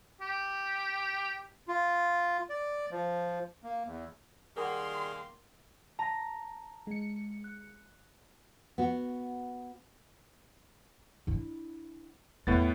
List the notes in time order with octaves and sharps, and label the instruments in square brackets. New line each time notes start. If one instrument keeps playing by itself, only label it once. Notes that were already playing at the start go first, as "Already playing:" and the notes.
[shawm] G4
[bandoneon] F4
D5
F3
A#3
E2
[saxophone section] D#3 G3 A#3 [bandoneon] G#4 [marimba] A#4 F#5 [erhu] C6
[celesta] A5 A#6 [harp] A#5
[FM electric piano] G#3 C#7
[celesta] F#6
[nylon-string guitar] B3 F#4
[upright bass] D4 E4
[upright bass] E2 [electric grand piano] A2 B3 A6